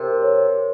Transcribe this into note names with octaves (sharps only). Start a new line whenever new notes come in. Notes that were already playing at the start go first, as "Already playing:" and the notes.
Already playing: C3 A#4
C#5